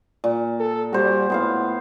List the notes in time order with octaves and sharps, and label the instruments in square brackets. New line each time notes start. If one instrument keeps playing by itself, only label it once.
[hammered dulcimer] A#2
[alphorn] A4
[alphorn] G3 [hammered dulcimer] F#4 C5
[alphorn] A2 [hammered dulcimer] B3 C5 F5